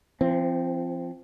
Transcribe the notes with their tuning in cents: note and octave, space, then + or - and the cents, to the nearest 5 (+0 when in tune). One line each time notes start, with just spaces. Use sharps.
F3 -30 C4 +0